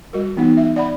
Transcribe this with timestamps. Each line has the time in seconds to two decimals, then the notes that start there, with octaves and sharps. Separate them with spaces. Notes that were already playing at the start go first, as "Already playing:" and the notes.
0.13 G3 F#4 A#4
0.36 E3 B3 D#4 F#5
0.57 E5
0.76 D5 F#5 B5